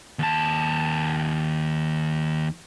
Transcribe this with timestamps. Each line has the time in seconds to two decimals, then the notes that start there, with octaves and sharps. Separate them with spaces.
0.19 D#2 A5